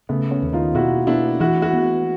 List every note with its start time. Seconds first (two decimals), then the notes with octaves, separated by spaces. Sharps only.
0.09 C#3 A3 B3
0.31 B3 C#4
0.42 D#2
0.53 D#4 F4
0.75 B2 E4 F#4
1.07 B3 D4 E4
1.40 E3 E4 F#4
1.62 E4 F#4
1.73 B3